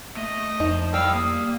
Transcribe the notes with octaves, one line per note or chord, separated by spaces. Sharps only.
A3 D#5
F2 F3 D#4
G3 E4 F5 G5 E6
A#3 D#6